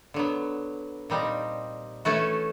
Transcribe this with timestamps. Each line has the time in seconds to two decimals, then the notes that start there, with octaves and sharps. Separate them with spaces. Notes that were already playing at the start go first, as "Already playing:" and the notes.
0.14 D3 F#3 B3
1.10 A#2 G3 C4 D#4
2.05 E3 A3 C#4 F#4 A4